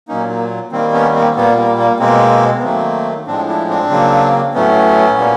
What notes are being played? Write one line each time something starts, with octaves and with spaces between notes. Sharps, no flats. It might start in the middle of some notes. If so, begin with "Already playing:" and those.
A#2 F#3 A#3 C#4 D#4
A#3
D#3 G3 A#3 C4
B3 C#4
A#3 C4
A#2 G3 A#3 B3
A#3
A#3
B2 G#3 A#3 C4
B3
D#3 F#3 A3 A#3 C4
A2 F3 G#3 C4 D4
D4 E4
C4 D4
C#3 F#3 A#3
A2 F#3 A3 B3 C#4
A#2 G3 A#3